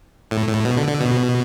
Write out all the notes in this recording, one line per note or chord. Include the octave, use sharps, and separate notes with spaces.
A2
A2
B2
D3
D3
B2